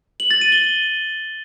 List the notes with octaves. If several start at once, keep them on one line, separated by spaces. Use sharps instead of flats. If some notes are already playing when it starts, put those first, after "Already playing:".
F#7
A6
D#7
G7